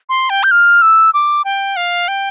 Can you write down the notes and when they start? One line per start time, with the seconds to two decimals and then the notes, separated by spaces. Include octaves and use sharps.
0.09 C6
0.30 G5
0.43 G6
0.51 F6
0.82 E6
1.14 D6
1.45 G5
1.76 F5
2.08 G5